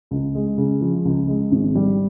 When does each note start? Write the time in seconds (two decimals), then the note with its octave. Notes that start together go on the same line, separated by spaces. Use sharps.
0.11 C#2
0.35 G#3
0.58 C#3
0.81 F3
1.05 C#2
1.28 G#3
1.52 G#1
1.75 G3